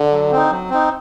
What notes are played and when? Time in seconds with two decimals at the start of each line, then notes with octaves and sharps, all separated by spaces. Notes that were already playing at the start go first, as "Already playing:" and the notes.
Already playing: D3
0.11 F#3
0.31 C4 D#4
0.51 F#3
0.70 C4 D#4